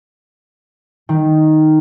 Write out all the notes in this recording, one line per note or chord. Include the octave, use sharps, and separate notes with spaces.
D#3